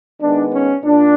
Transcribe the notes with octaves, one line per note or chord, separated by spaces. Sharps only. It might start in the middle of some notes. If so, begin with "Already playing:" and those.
D#3 G#3 B3 D4
C#4
A#2 D4